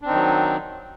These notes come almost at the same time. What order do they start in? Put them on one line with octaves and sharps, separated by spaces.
D4 C4 D#4 D#3 F#3